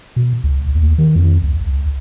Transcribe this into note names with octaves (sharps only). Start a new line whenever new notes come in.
B2
C#2
D#2
D#3
F2
C#2
C#2